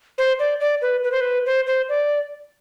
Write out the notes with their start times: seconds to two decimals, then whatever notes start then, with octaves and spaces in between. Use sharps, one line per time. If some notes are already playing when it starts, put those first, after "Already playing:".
0.18 C5
0.39 D5
0.60 D5
0.82 B4
1.04 B4
1.12 C5
1.21 B4
1.46 C5
1.67 C5
1.89 D5